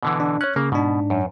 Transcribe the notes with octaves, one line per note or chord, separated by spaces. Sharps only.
B2 D3 E3
D4
C#4 C#5 F#6
C#3 A#3
G#2 B2 D4
F#2